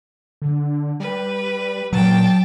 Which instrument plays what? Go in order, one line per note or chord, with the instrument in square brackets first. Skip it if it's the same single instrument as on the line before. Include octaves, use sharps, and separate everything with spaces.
[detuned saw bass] D3
[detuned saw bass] G3 [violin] B4
[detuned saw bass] A#2 [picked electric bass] F#3 [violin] G5 A5